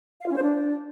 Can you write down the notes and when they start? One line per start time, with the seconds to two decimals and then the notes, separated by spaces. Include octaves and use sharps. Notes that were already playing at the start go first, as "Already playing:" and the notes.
0.20 F5
0.25 F4
0.30 C#4
0.36 C5
0.41 D4